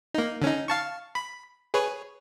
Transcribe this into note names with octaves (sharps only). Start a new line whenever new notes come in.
A#3 D#4
D3 C#4 D#4
F5 A5 C#6
B5
G#4 B4 C#5